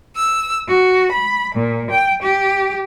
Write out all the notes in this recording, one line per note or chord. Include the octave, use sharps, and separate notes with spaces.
E6
F#4
B5
A#2
G5
G4